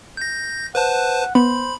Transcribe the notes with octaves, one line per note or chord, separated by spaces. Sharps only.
G6 A#6
B4 C5 F#5 A5
B3 C5 B5